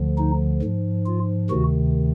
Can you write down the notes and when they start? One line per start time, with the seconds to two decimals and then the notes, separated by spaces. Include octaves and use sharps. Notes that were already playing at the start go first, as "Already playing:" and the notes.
Already playing: D2 D3 F3
0.18 D#4
0.62 G#2 F3
1.06 F4
1.50 D2 C3 D#3 F#4